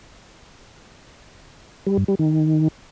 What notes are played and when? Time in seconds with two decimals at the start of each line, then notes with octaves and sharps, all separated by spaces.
1.87 G3
1.97 G2
2.08 G3
2.19 D#3